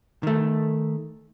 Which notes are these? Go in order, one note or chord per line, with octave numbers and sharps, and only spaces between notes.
D#3 A3